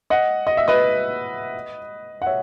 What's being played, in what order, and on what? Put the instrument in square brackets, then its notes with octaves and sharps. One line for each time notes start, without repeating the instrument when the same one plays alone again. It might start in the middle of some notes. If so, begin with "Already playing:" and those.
[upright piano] D#5 F#5
D#5
E5
B4 D#5
F#5
C#5 E5